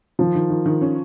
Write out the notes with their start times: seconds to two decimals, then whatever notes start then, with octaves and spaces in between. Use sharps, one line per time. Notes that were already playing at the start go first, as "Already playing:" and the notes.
0.19 D#3 F3
0.35 D#3
0.50 D#3
0.66 D#3
0.81 C#4